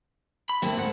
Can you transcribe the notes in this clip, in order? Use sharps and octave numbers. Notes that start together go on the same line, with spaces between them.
B5
D2 A3 A#3 C4
G#2 F#5